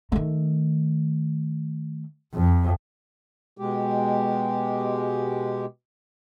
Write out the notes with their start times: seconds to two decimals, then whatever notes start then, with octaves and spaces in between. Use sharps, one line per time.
0.12 D#3 A3
2.34 F2
3.58 B2 G#3 G4